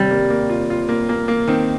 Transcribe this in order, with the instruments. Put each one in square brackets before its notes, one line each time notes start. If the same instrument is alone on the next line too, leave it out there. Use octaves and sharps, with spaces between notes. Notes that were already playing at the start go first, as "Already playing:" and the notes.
Already playing: [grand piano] D#2 [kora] C3 G3
[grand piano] A#3
A#3
F4
F4
A#3
A#3
A#3
[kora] D#3 [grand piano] C4